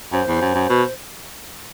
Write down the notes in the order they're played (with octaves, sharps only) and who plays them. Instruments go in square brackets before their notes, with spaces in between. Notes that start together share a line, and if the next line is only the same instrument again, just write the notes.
[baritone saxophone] F#2 [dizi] C5
[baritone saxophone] E2
F#2
F#2
B2